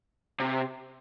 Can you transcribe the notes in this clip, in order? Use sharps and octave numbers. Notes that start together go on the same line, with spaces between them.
C3